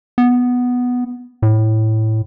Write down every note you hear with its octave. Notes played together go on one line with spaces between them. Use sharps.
B3
A2